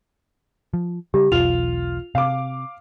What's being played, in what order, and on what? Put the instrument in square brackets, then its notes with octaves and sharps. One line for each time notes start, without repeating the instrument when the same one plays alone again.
[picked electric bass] F3
[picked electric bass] C#3 G3 [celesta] G4
[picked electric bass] E1 B1 E2 [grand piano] F4 [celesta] F7
[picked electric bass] C3 [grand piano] F5 D6